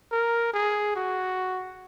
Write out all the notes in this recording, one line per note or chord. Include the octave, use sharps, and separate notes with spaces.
A#4
G#4
F#4